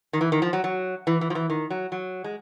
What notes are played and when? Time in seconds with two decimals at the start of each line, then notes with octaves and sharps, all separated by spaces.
0.13 D#3
0.21 E3
0.32 D#3
0.42 F3
0.53 F#3
0.64 F#3
1.07 E3
1.21 E3
1.30 F3
1.35 E3
1.50 D#3
1.70 F#3
1.92 F#3
2.24 G#3